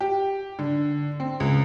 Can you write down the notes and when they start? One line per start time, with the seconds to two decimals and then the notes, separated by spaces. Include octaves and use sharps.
0.01 G4
0.59 D3
1.20 C4
1.40 C#2